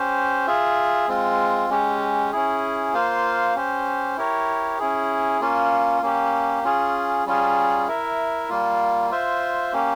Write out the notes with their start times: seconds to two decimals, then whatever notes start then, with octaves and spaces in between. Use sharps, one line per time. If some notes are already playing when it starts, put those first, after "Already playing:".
Already playing: C#4 G4 C5
0.47 F4 G#4 E5
1.08 G#3 C4 F4
1.69 G#3 C#4 G4
2.32 C#4 E4 G#4
2.93 A#3 F4 C5 F5
3.55 C#4 G4 C5
4.17 E4 G4 A#4 C#5
4.79 C#4 E4 G#4
5.41 A#3 C#4 F4
6.02 A#3 C#4 G4
6.63 C#4 F4 G#4
7.25 G3 C#4 F4 G#4
7.87 E4 A#4 E5
8.49 G3 A#3 F4
9.10 F4 C5 E5
9.73 A#3 C#4 G4